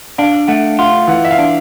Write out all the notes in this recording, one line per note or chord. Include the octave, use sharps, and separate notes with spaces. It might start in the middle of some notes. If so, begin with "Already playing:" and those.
D4 F5
A3 F#5
F4 F#5
E3 F#5
E5
F5
D4